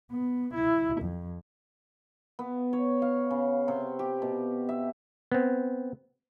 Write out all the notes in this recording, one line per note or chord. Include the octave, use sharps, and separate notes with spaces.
B3
E4
F2
B3
C#5
F5
C#3
C3
G4
B2
E5
B3 C4